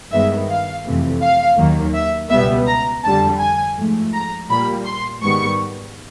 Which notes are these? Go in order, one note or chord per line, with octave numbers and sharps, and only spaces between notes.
G2 D#3 G#3 B3 E5
F5
F2 C3 E3 A3
F5
D#2 D#3 F#3 A#3
E5
C#2 B2 G3 B3 E5
A#5
F2 D3 G3 A5
G#5
G#2 F3 A3
A#5
A#2 G3 A#3 B5
C6
G#2 D#3 G3 B3 C#6